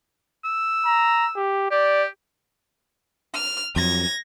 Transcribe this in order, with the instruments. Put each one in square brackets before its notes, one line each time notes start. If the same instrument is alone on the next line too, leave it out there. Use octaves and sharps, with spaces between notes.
[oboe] E6
[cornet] A#5
G4
[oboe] G4 [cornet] D5
[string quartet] F6
[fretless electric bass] F2 F#3 [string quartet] G#6 A#6